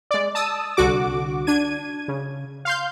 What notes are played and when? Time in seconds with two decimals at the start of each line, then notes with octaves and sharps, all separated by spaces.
0.11 G#3 D5
0.35 A5 D#6 E6
0.77 C2 D3 F#4 D6
1.47 D4 G#6 D#7
2.08 C#3
2.65 F5 C6 G6